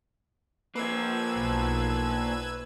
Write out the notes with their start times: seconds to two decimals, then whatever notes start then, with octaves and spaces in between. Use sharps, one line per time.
0.76 F3 A#3 B4 E6 G#6
1.36 B1